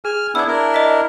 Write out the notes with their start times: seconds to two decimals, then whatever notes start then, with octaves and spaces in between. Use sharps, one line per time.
0.05 G#4 G#5 F6
0.35 B3 D4 E4 E6 G#6
0.48 D4 E4 A#4
0.74 D#5 B6